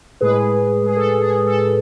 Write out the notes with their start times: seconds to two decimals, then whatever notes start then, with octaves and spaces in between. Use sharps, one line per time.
0.21 A2 G#3 G#4 B4
0.86 G#4
0.97 A4
1.21 G#4
1.46 A4